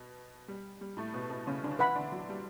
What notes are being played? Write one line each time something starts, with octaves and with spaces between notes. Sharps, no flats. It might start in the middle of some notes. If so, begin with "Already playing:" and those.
Already playing: B2
G3
G3
A2 A3
B2 B3
B2 B3
C#3 C#4
D3 D4
E3 E4 B4 F#5 B5
D3 D4
F#3
G3